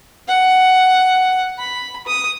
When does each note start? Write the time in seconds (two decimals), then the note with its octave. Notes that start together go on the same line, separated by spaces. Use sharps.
0.28 F#5
1.58 B5
2.07 D#6